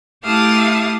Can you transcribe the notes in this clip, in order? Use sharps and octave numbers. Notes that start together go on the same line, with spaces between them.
A3 E4 G4 F5 A5 D#6